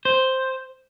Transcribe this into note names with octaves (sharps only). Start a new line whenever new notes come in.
C5